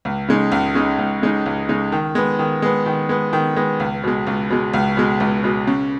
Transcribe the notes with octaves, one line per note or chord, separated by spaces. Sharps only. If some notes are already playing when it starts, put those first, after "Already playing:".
C#2
C#3 G#3 D#4
C#2
C#3 G#3 D#4
C#2
C#3 G#3 D#4
C#2
C#3 G#3 D#4
D#3
G#3 B3
D#3
G#3 B3
D#3
G#3 B3
D#3
G#3 B3
C#2
B2 G#3
C#2
B2 G#3
C#2
B2 G#3
C#2
B2 G#3
C#3